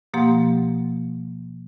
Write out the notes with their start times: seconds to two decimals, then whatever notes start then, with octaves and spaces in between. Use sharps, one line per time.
0.14 B2 F3 A#3 G4 F#5 C6